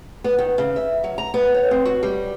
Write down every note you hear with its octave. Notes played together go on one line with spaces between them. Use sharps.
B3
D#3
C#3
E5
F#3
A#5
B3
C#5
C4
F#4
G3